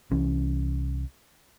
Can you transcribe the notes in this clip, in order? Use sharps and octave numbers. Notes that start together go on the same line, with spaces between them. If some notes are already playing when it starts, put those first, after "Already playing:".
C2 E3 C#4